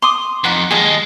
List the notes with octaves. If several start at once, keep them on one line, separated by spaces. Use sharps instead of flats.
C6 D6 D#6
F2 D#4 F#5 B5
D#2 G#3 G#4 D#5 A5